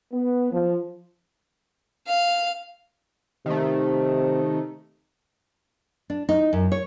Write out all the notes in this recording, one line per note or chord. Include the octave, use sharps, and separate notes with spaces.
B3
F3
F5
C3 D#3 A3
D4
D#4
F#2
C#5